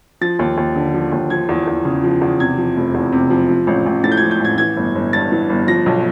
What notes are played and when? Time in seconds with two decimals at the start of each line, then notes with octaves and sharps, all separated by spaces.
0.21 F3 A6
0.39 D#2
0.57 D#2
0.76 D3
0.94 F3
1.12 D#2
1.30 F3 G#6
1.49 E2
1.67 E2
1.85 C#3
2.03 F3
2.21 E2
2.40 C3 G#6
2.58 F3
2.77 F1
2.94 E2
3.12 C3
3.30 F3
3.49 F3
3.67 A1
3.86 A1
4.04 A2 A6
4.12 G6
4.17 F3 G#6
4.31 G6
4.40 A1 G#6
4.58 E3 G#6
4.77 G1
4.95 G1
5.13 G2 A6
5.32 E3
5.50 G1
5.68 F3 A#6
5.86 B1